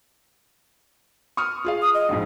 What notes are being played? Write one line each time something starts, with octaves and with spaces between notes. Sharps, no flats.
C#6 D#6 F6
F4 G#4 F5
D#6
D#5
A#1 F2 G#2